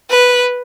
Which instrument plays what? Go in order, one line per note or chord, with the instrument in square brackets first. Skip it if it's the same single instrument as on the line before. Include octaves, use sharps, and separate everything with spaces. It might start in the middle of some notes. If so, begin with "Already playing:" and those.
[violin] B4